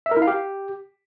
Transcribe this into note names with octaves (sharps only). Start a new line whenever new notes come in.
E5
A#4
E4
F5
G4